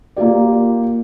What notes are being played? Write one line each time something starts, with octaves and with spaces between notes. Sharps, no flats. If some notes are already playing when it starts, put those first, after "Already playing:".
A#3 F4 G4 D5